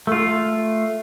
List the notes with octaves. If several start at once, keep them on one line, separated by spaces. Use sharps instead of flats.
A3 F4